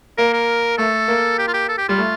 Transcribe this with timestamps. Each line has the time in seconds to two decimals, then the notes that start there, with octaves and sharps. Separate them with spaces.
0.18 A#3 A#4
0.33 A#4
0.78 A3 A4
1.08 A#3
1.38 G4
1.48 F4
1.54 G4
1.69 A4
1.78 G4
1.89 G3 F4
1.98 A3